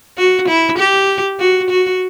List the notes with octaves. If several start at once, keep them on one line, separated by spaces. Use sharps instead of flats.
F#4
E4
G4
F#4
F#4